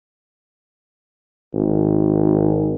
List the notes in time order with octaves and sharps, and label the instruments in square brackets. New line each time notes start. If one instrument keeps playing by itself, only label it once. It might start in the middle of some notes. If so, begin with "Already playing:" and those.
[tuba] G#1